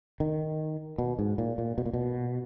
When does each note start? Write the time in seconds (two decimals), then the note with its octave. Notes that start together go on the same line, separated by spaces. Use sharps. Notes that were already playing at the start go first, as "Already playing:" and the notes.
0.20 D#3
0.98 B2
1.19 G#2
1.38 A#2
1.58 A#2
1.78 B2
1.86 A#2
1.93 B2